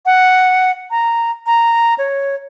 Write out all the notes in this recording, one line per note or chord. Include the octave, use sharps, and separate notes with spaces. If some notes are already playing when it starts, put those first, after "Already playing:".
F#5
A#5
A#5
C#5